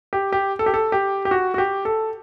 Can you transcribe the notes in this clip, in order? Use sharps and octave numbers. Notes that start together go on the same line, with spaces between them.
G4
G4
A4
G4
A4
G4
G4
F#4
F#4
G4
A4